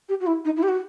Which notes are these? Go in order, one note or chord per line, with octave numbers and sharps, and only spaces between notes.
G4
F#4
E4
D#4
E4
G4
F#4